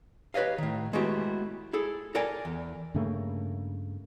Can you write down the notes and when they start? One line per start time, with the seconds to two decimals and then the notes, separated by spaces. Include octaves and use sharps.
0.34 G4 B4 C#5 D#5 F5
0.58 A2 D#3
0.93 G#3 A3 B3 E4 F#4 G4
1.73 E4 G#4 A4
2.15 A4 A#4 D5 G5 G#5
2.45 E2
2.94 G2 C#3 A3 A#3